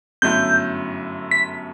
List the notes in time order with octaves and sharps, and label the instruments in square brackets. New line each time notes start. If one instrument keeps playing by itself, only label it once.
[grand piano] G1 F#2 F#3 A3 E4 [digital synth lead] G6
[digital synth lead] B6